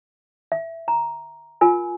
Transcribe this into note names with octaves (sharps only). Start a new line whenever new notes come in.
E5
A#5
F4 A#4 G#5